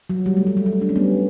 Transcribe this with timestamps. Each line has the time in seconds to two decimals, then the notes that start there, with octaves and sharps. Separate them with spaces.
0.10 F#3
0.26 G3
0.37 A3
0.47 G3
0.57 A3
0.66 G3
0.81 D4
0.89 C#4
0.96 G3 B3